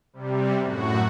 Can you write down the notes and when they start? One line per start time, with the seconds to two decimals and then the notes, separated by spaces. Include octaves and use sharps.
0.13 C3 G3
0.60 F#2 A2 F#4